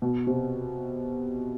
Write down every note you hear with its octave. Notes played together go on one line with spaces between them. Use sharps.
B2
C3